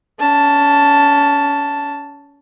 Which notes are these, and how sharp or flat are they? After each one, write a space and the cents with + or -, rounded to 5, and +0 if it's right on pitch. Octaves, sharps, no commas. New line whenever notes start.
C#4 +30 A5 +0